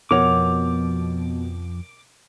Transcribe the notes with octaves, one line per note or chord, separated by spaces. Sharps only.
F2 B2 F3 A#4 C#5 F#5 D6 F7